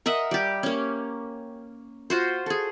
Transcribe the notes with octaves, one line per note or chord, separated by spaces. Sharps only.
A#4 D#5 E5 F#5
G3 G4
A#3 C#4
F4 F#4 C5
G#4 A4